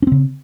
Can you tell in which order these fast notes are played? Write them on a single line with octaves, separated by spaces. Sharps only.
C#4 C4 C#3